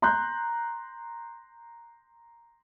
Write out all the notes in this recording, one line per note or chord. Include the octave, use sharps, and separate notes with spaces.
A#5 C6 F#6 G6